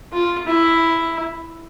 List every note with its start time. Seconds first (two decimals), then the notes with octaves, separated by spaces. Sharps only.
0.13 F4
0.47 E4